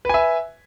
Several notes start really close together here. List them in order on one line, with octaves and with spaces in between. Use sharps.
B4 G#5 E5